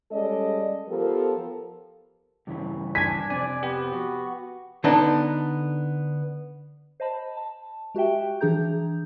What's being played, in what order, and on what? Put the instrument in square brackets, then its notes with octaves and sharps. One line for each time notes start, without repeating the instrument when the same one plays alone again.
[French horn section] G3 G#3 C#4 A4 D5 D#5
F3 B3 G4 A4 A#4
[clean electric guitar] G2 C#3 E3
[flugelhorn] D4 [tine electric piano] G#5 G#6 [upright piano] B6
[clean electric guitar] F2 C3 [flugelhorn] D5 [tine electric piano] G#5
[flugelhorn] B3 [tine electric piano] G4
[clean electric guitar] F#4
[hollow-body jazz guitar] D3 B3 D4 D#4
[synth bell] C5 D#5 A5 B5
A5
G#3 F#4 G4 E5 G5
E3 F3 D4 G#4 A#5 G6